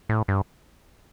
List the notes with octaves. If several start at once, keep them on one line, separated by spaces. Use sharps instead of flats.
A2
G2